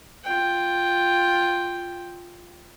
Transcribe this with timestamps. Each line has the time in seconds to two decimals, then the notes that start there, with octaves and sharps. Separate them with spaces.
0.24 F4 G5